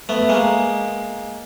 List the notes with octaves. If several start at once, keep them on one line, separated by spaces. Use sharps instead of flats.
A3 B3
G#3 A#3